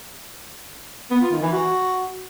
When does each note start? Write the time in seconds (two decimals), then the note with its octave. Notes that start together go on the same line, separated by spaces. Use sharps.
1.11 B3
1.21 F4
1.32 D#3
1.42 E3
1.52 F#4